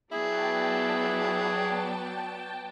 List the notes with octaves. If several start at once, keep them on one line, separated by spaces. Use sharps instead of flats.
F#3 B3 E4 G#4 D5 G5 A5